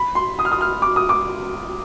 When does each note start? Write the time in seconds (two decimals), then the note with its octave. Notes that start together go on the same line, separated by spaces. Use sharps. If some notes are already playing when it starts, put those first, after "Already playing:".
Already playing: B5
0.15 C6
0.39 D#6
0.45 F6
0.52 D#6
0.61 F6
0.82 D6
0.96 D#6
1.09 D6